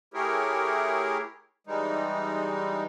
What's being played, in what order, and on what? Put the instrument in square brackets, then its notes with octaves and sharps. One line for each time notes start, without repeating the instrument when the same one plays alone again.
[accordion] A3 E4 G4 G#4 A#4 C#5
E3 G3 G#3 D#4